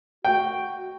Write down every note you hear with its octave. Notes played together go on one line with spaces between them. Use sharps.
F#4 G5